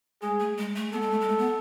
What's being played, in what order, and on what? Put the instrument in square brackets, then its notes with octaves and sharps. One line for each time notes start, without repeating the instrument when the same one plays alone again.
[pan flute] G#3 [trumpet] G#4
[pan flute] A3
G#3
A3
[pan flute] B3 [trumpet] A4
[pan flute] G#3
A3
G#3
A3
B3